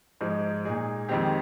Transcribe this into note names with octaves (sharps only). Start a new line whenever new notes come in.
G#2 F3 G#3 D#4
A#2 G#3 D#4 G#4
F2 D#3 G#3 C4 G4